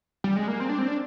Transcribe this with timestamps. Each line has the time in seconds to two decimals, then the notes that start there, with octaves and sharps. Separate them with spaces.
0.24 G3
0.36 G#3
0.48 A#3
0.60 C4
0.69 D4
0.79 C4
0.88 D4